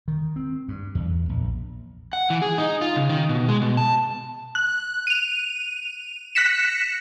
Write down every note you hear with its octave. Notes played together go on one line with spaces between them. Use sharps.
D#3
C4
G2
E2
A#1
F#5
E3
G#4
D#4
F4
C#3
D#3
B2
G#3
B2
A5
F#6
D#7 F7
F#6 A#6 B6 C#7 E7